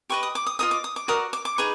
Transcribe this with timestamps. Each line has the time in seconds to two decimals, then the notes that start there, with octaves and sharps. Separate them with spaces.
0.09 G4 B4 D#5 C#6
0.23 D#6
0.35 D6
0.46 D#6
0.59 F4 A#4 D#5 D#6
0.71 D6
0.84 D#6
0.96 D6
1.08 F#4 A#4 D5 D#6
1.33 D6
1.45 D6
1.58 D#4 G#4 B4 C#6